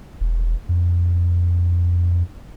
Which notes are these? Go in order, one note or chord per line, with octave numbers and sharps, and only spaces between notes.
E1
F2